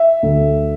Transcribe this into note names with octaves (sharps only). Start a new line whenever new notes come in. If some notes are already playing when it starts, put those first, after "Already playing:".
Already playing: E5
D2